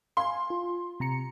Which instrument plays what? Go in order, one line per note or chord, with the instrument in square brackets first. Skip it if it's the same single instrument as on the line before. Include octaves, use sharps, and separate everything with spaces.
[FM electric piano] F5 G#5 [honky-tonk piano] C6
[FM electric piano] F4
C3 A#5 C#7